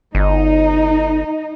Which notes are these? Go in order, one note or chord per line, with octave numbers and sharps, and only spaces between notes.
G1 D#4